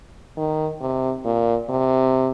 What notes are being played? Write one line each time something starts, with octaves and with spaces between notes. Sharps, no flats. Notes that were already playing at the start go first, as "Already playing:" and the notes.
D#3
C3
A#2
C3